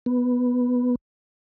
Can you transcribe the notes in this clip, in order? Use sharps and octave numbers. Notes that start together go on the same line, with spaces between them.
B3